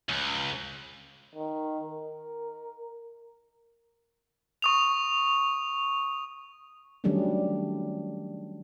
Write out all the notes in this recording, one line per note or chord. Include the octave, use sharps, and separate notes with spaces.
C#2
D#3
A#4
C#6 D#6 F7
D#3 F#3 G3 A3 C#4 D4